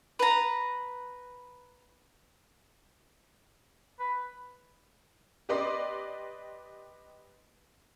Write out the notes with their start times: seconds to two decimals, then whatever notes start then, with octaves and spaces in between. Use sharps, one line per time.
0.19 B4 A#5
3.99 B4
5.49 G4 B4 D5 D#5 C6 D6